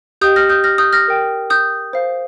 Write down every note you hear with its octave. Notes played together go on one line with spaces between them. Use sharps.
G4 D#5 G5 D#6 G6
F6 A#6
D#6 G6
F6 A#6
D#6 G6
F6 A#6
A#4 G5
D#6 G6
C5 F5